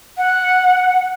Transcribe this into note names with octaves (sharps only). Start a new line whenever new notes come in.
F#5